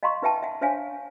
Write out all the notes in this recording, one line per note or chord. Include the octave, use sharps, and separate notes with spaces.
D#5 F5 F#5 A#5 C6 C#6
D#4 B4 E5 G5 A5
E5 F#5
D4 C5 C#5 E5 F5 G#5